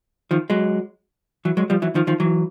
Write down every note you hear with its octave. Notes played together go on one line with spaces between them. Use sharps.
D#3 F3
F#3 G#3
E3 F#3
F#3 G#3
F3 G3
E3 F#3
D#3 F3
D#3 F3
E3 F#3